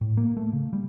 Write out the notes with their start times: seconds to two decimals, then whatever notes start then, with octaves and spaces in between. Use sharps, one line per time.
0.01 A2
0.17 A#3
0.37 A3
0.53 C#3
0.73 G3